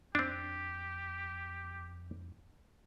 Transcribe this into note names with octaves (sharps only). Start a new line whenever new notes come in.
F2 C4 D4 G4